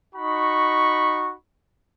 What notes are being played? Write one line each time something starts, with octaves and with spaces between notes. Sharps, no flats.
D#4 F#4 B5 C#6